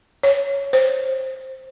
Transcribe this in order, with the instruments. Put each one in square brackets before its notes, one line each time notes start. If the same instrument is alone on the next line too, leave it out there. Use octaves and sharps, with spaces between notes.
[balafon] C#5
C5